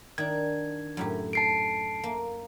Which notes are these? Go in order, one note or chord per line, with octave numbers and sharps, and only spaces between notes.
D#3 D4 G#6
F#2 A2 G4
A5 C7 D7
A#3